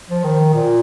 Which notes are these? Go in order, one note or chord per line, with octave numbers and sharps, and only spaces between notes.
F3
D#3
A#2